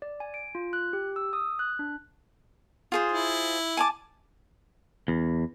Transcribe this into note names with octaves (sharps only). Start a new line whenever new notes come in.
D5
G#5
D7
F4
F#6
G4
E6
D#6
F#6
D4
F4 G#4 C5
E4
G#5 A5 D6
E2